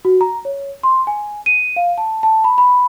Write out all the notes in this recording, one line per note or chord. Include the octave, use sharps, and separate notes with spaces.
F#4
A#5
C#5
C6
G#5
D#7
F5
A5
A5
B5
B5